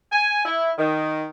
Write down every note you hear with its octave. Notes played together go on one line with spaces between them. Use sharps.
G#5
E4
D#3